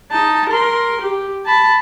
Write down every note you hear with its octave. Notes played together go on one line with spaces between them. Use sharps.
D#4 A5
A#4 C6
G4
A5 B5